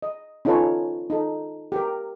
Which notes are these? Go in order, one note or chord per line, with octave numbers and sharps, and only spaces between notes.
D#5
C#4 D#4 F4 A4 B4 C#5
D#4 A4
G4 A#4